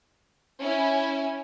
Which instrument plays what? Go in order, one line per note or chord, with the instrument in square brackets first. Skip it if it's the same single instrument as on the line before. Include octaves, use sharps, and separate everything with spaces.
[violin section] C#4 E4 G#5